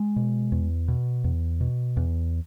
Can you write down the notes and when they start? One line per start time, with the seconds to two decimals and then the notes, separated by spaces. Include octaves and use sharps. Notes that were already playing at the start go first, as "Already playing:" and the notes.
Already playing: G#3
0.16 B2
0.52 E2
0.88 B2
1.24 E2
1.61 B2
1.97 E2